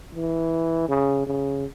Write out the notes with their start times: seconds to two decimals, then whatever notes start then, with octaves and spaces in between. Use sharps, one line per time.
0.15 E3
0.88 C#3
1.26 C#3